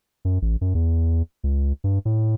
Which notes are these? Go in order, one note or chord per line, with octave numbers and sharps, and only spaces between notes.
F#2
A1
F#2
E2
C#2
G2
A2